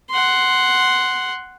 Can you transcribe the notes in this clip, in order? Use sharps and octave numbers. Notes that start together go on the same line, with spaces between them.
F#5 C6